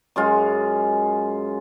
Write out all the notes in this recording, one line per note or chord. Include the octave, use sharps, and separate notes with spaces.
F#2 G#3 F4